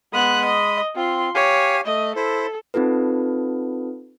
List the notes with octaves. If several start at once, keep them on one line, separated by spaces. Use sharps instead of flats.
G#3 B3 B5 D#6 F#6
D#5
C4 F4 C6
G4 C#5 F5 G#5
A3 D#5
E4 A4 C5
C4 D#4 F4 A4 B4